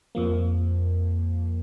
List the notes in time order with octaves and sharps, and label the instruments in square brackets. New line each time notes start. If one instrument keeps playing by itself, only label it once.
[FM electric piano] F2 F3 A#3